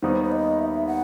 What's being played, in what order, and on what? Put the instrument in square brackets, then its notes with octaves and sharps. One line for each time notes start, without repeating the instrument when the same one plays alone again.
[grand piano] D#2 D#3 G3 B3 D#4 [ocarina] C5
[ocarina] C5
D#5
E5
F#5